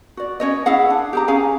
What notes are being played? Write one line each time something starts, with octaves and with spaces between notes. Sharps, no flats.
F#4 D5
C#4 C#5 D#5
E4 G#4 F5 F#5
D4
G4 G#4 A#5
C#4 G#4 F5 G#5